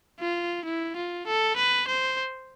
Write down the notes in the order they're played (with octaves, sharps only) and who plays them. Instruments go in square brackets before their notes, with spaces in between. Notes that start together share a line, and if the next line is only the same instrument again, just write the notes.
[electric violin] F4
E4
F4
A4
B4
C5